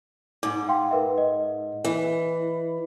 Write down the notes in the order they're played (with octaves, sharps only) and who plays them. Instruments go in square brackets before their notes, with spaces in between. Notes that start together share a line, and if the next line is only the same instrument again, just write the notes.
[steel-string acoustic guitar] G#2 [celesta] D6
[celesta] F5 G5 C6
A#4 B4 E5
D#5
[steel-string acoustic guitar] E3